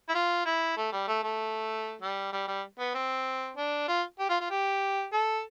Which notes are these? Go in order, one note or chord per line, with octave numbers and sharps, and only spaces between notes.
E4
F4
E4
A3
G3
A3
A3
G3
G3
G3
B3
C4
D4
F4
G4
F4
F4
G4
A4